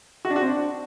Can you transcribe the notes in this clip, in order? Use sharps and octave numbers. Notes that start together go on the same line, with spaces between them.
F#4
D4
F#4
C4
D4